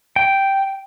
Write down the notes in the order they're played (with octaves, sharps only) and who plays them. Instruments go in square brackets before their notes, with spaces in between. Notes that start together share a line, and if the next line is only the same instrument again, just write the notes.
[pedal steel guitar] G5